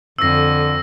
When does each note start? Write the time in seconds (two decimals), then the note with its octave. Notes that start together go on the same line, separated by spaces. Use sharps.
0.18 F2 D3 E6 A#6